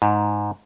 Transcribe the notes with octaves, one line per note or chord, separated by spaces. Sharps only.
G#2